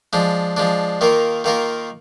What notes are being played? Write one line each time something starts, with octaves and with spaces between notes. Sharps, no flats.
F3 G#3 D4
F3 G#3 D4
D#3 A#3 F4 A#4
D#3 A#3 F4 A#4